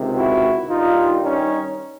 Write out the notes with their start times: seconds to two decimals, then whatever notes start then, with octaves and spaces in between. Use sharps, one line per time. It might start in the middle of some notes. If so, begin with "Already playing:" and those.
Already playing: C#2 C3 D#3
0.17 E4 F#4
0.69 G2 D#3 G3 D#4 F4
1.22 C#4 D#4